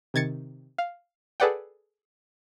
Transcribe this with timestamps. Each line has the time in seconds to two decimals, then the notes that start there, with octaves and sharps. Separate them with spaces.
0.14 C3 D#3 G#6 A6 C#7
0.78 F5
1.40 G#4 A4 B4 D5 F#5 G5